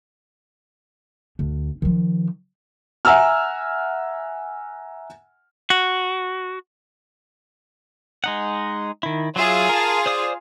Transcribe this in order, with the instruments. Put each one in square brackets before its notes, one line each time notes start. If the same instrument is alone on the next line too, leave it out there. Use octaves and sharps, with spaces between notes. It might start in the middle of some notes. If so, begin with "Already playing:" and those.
[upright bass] D2
D#3 F3
[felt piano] E5 F#5 G#5 A#5 E6 F6
[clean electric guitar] F#4
[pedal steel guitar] G#3 D#4 F#5
D#3 E4
[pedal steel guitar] F#3 E5 [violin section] F4 G#4 F5
[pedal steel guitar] A#4 A5
C5 D5 D#6